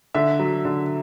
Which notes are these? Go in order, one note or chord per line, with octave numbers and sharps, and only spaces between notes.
D3 E5
F#3
D3